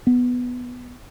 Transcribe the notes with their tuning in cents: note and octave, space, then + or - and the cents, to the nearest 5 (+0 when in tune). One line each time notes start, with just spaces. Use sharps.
B3 +0